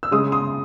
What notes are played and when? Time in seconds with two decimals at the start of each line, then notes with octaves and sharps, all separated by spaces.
0.03 E6
0.11 C#3 G#3 C6 D#6
0.32 C6 D#6